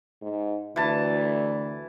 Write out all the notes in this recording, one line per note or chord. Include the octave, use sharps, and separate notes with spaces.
G#2
D2 E3 A5